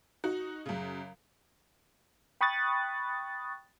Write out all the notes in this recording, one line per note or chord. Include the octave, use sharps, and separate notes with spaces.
D#4 F#4
F#2 C#3
G5 B5 C#6 D#6 F#6 A6